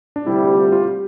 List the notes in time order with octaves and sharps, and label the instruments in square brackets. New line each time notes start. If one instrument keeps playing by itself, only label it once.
[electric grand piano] D4
[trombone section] D2 C3 G3 [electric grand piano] E4
[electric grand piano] G4
F4
F4
G4